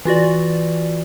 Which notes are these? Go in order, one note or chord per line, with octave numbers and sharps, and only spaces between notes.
E3 F4 F#4 D5